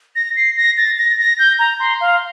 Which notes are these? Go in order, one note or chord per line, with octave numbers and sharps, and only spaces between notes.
A#6
C7
A#6
A6
A#6
A#6
G6
A#5
C6
F5